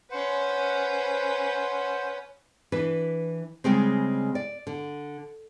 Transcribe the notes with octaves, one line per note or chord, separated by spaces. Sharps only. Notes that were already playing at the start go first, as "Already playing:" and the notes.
C#4 B4 C5 F#5
E3 D4 B4
C#3 G3 G#3 C4
D5
D3